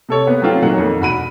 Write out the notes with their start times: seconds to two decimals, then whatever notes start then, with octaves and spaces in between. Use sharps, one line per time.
0.09 C3 A4 C#5
0.27 A#3 B3 B4
0.42 F#3 A3 C4 F4 G4
0.62 A#2 D#3 F#3 F#5
0.78 F2 D#3 A#3
1.01 E1 F#4 B5 D#7